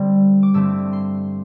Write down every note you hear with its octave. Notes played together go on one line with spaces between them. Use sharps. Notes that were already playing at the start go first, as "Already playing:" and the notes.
Already playing: D3 G3 C4
D6
G2 D3 A3 C4 E6
C6